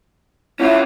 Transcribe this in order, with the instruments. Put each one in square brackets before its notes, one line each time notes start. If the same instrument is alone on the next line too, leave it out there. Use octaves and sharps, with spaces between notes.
[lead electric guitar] C#4 F4 [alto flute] E4